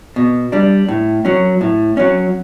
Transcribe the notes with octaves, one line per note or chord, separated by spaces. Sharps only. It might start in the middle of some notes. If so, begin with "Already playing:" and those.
B2
G3 D4
A2
F#3 C#4
A2
F#3 C#4